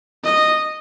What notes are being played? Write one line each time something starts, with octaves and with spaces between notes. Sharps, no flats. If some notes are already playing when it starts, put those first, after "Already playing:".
D#5